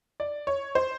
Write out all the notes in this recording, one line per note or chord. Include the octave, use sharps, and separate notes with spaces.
D5
C#5
C5